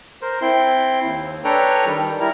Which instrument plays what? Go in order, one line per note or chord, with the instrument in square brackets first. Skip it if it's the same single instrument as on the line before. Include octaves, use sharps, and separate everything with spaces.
[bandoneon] A#4 C5
C4 E4 C6
D#2
D4 A4 B4 C#5 G5 A#5
D#3 G3
G3 E4 A#4 F6